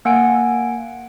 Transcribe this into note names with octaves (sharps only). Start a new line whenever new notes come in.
A#3 F#5 G#5 D7